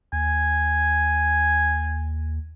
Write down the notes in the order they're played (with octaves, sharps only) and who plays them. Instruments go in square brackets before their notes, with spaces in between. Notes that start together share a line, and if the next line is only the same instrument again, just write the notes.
[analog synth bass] D#2 [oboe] G#5